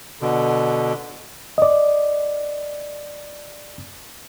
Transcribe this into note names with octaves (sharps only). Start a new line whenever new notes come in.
B2 D3
D5 D#5